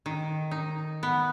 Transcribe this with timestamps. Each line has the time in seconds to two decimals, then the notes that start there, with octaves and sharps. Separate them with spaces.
0.06 D#3
0.51 D#4
1.03 B3